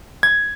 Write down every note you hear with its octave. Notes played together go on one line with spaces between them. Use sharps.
G#6